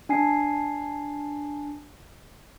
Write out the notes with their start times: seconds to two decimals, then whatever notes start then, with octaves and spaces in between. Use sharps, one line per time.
0.09 D4 G#5 C7